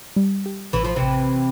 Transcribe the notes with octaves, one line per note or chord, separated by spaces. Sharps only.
G3
G4
A1 E3
F3
C3 E3
A1